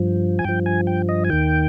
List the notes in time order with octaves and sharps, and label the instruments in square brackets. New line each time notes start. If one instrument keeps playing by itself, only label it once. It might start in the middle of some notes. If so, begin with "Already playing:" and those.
Already playing: [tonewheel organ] G2 F3
G#5
G2 F3 G5
G#5
G5
D#5
G#5
D#2 D#3 G5